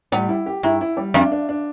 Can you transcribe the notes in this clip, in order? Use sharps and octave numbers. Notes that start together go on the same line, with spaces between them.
A2 G3
E4
G4
G2 E4
E4
G3
F2 D4
D4
D4